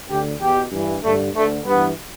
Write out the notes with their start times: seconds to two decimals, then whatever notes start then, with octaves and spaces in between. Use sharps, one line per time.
0.09 D2 D3 G4
0.41 E2 B2 G4
0.72 G2 E3
1.03 G2 D3 A3
1.35 D2 D3 A3
1.66 G2 E3 B3